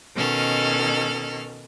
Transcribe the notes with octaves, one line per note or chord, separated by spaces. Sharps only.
B2 D#3 C#4 A4 F6